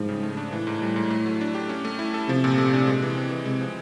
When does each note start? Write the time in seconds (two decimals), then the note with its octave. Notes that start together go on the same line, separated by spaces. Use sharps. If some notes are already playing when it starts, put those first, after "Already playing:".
Already playing: G#2 F3 G3
0.09 C#3
0.23 A3
0.37 D4
0.52 A2 E3
0.67 G#2
0.82 G3
0.96 G#2
1.10 A3
1.26 F#3
1.41 D4
1.55 G4
1.69 C#4
1.85 A3
1.99 E4
2.14 A4
2.29 C3 F3
2.44 A#2
2.58 A3
2.73 D4
2.87 G#3
3.02 E3
3.17 C4
3.31 E3
3.46 C3 G#3
3.61 F3